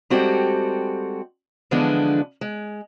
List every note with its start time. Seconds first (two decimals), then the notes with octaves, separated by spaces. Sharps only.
0.10 G3 G#3 C4 F#4 G4 A4
1.71 D3 E3 F3 G#3 B3 D4
2.41 G#3